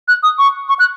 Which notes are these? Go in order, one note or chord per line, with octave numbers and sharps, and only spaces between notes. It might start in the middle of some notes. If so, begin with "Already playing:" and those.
F#6
D#6
C#6
C#6
F#6